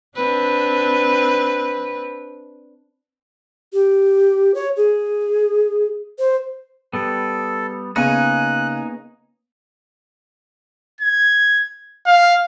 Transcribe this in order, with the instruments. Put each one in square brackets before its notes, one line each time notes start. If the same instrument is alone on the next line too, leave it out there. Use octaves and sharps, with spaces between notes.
[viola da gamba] C4 D4 B4
[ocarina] G4
C#5
G#4
C5
[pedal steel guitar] G3 B3 [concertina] A4
[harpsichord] C#3 [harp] A#3 B3 C#4 [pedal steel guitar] D#4 G#5 [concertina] F#6
[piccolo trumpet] G#6
F5